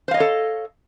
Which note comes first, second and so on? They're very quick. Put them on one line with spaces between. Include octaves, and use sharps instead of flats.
C5 F5 D#5 C#5 A4